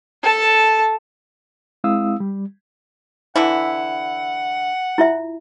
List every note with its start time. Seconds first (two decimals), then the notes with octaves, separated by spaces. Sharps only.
0.22 A4 A5
1.84 G#3 C4 E4 F5 D#6 E6
2.20 G3
3.36 D3 E3 E4 F#5
4.98 E4 F4 E5